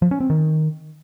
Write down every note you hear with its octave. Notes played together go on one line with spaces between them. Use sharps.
F3
C#4
C4
D#3